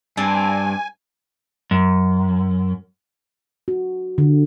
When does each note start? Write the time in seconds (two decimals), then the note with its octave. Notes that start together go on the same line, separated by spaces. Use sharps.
0.17 G2 C4 D4 G#5
1.71 F#2
3.68 F#4
4.18 D3